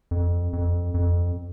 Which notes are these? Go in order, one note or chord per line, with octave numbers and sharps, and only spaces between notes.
F2
F2
F2